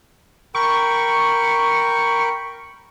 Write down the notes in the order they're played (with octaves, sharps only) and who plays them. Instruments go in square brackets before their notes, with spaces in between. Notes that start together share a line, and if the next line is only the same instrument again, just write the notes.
[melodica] A#4 G5 B5 [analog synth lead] C#6